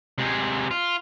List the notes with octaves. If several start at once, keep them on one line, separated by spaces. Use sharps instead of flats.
C3 G#3
F4